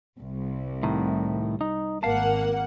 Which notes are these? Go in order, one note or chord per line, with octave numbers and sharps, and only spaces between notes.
C2
A2 D#3
D#4
G#1 A#3 F5 F#5 A5